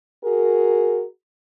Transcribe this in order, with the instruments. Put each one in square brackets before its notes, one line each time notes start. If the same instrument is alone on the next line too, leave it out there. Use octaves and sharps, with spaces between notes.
[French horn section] F#4 G#4 A#4